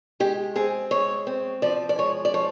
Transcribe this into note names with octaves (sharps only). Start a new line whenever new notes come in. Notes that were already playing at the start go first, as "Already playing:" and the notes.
G#3 G4
C4 G#4
G#3 C#5
C4
F3 D5
D5
G#3 C#5
D5
F3 C#5